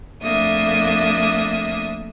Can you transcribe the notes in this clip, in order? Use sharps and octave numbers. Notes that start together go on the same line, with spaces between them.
F2 A3 A#3 D4 E5 D#6